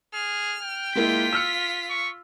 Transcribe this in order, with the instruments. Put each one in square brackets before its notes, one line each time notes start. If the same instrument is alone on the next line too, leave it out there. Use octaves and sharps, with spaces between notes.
[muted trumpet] G#4 [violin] F6
[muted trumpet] G5
[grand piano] G#3 A#3 E4 [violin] F4 B6
[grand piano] E6 F6 C#7
[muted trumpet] C#6